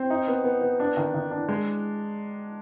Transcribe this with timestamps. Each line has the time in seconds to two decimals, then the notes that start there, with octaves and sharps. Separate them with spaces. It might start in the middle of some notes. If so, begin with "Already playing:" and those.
Already playing: C4
0.10 D#4
0.28 B3
0.44 B3
0.61 B3
0.80 D4
0.97 D#3
1.14 D#3
1.31 D4
1.49 G#3